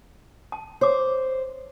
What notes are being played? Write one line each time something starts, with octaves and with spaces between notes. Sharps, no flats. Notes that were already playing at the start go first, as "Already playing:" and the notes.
A5
C5 C#5 D6